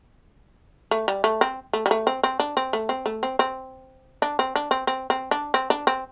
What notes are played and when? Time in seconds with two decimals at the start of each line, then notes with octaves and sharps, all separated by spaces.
0.91 A3
1.08 G3
1.24 A3
1.41 C4
1.73 A3
1.86 G3
1.91 A3
2.07 C4
2.23 C4
2.40 D4
2.57 C4
2.73 A3
2.89 C4
3.06 A3
3.23 C4
3.39 C4
4.22 D4
4.39 C4
4.56 D4
4.71 C4
4.87 C4
5.10 C4
5.31 D4
5.54 C4
5.70 D4
5.87 C4